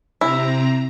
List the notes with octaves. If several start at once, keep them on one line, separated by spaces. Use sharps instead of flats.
C3 C4 E4 A#5